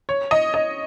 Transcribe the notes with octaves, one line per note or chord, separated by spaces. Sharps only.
C#5
D#5
D#5